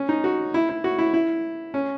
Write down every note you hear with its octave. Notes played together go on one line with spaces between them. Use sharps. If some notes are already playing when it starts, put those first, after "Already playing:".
Already playing: C#4
D#4
F#4
E4
E4
F#4
E4
E4
C#4